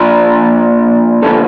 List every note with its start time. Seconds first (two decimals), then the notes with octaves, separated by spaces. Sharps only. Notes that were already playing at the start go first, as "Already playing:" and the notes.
Already playing: A#2 F3 A#3 D4 A#4
1.22 G2 D3 F3 A#3 A4